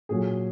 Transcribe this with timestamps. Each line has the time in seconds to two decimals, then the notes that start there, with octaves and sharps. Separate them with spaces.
0.09 A#2 F#3 A#3 G#4